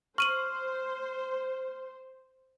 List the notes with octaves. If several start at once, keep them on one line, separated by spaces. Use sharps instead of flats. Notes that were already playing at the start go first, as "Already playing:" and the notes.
C5 C#6 F6 D#7 F#7